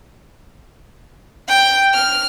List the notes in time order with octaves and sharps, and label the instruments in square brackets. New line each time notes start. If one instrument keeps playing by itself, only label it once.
[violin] G5
F6